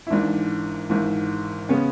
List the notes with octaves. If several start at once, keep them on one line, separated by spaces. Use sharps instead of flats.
E4
G#1 G#2 E3 D4
G#1 G#2 E3
C#3 G#3 B3 C#4